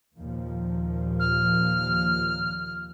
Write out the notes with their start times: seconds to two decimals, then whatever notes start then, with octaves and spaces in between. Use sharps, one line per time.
0.17 D#2 A#2 F3
1.19 F6